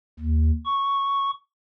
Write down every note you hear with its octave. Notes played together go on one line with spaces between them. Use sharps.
D#2
C#6